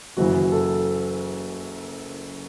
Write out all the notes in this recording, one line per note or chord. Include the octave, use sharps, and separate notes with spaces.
F#1 F#2 E3 F#4
A4